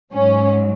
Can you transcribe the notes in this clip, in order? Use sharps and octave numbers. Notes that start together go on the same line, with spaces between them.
G#2 F#3 C#4